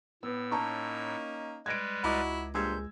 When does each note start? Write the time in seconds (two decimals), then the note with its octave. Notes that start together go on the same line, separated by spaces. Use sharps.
0.23 A2 B3 E6
0.51 A#3 C#4 D#4 A5 A#5 C#6
1.66 G3 G#3 B4 G#6 A#6 D7
2.04 C#2 E4 F#4 D#5 F#5 A#5 D6
2.54 G2 A#2 G#3 C5 E6 G6 G#6